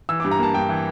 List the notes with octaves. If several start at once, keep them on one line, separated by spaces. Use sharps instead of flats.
E3 E6
G2 D6
A#5
A#3 A5
G2 G5
E3